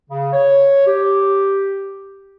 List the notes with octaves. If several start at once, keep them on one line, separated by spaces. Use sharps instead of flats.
C#3
C#5
G4